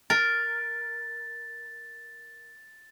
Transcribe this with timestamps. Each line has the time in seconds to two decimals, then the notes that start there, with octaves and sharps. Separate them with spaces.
0.10 A#4 A6